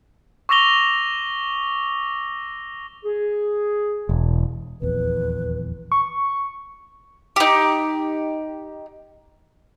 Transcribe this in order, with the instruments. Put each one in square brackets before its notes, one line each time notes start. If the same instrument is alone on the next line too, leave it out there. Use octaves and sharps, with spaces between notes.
[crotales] C#6 D6 E6 A#6 F7 G7
[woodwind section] G#4
[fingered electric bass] E1
[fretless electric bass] D#1 A#1 E2 [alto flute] B4
[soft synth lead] C#6
[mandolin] D#4 G4